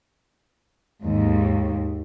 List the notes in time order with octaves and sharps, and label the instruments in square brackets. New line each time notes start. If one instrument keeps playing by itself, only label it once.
[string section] D#2 G#2